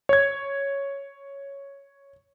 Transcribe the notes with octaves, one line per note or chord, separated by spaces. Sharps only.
C#5 G#6